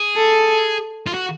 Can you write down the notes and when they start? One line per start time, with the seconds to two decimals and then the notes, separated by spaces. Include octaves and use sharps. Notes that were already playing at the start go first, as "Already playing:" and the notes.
Already playing: G#4
0.17 A4
1.07 F4
1.14 F#4